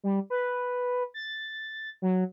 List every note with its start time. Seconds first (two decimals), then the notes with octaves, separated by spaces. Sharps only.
0.04 G3
0.30 B4
1.14 A6
2.02 F#3